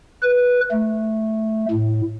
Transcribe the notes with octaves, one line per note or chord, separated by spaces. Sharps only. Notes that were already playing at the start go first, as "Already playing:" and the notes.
B4
A3
A2